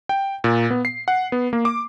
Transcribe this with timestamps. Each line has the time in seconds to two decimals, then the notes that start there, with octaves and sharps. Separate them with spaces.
0.09 G5
0.44 A#2
0.70 B3
0.85 C7
1.08 F#5
1.32 B3
1.53 A#3
1.65 D6